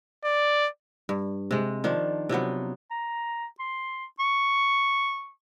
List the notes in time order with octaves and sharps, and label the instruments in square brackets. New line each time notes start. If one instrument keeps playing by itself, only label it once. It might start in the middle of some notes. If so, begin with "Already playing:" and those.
[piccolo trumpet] D5
[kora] G2
C3 G#3
D#3 F3 D4
C3 F3 F#3 B3
[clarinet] A#5
C6
C#6